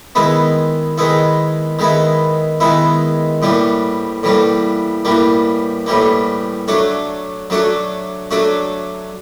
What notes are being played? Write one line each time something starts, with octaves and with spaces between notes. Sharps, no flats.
D#3 G#3 B3 E4
D#3 G#3 B3 E4
D#3 G#3 B3 E4
D#3 G#3 B3 E4
A2 E3 G3 A#3
A2 E3 G3 A#3
A2 E3 G3 A#3
A2 E3 G3 A#3
F#3 A3 D4 F#4
F#3 A3 D4 F#4
F#3 A3 D4 F#4